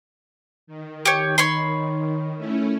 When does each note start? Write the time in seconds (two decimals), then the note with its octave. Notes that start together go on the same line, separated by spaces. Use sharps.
0.67 D#3
1.05 G4 C#5
1.38 C#5 B5 C6
2.37 A3 C#4 E4